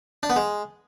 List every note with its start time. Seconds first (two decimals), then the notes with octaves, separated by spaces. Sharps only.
0.23 D4
0.30 B3
0.36 G#3